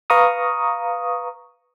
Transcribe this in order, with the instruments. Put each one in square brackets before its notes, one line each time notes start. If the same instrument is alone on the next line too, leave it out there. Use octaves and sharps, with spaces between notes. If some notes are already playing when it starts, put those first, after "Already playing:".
[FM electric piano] B4 F5 A#5 C#6 D#6